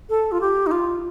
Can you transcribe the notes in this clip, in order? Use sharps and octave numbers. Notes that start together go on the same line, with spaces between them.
A4
F4
G4
D#4
F4